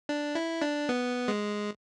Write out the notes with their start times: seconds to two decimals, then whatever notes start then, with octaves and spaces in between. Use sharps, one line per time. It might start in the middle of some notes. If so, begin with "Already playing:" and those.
0.09 D4
0.35 E4
0.62 D4
0.89 B3
1.28 G#3